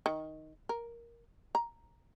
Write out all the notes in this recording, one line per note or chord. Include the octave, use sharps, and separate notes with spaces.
D#3
A#4
A#5